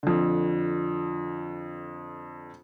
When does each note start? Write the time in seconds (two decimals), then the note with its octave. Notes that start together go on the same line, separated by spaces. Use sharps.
0.03 F2 D3